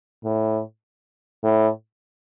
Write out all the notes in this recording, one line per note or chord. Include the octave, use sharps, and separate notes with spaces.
A2
A2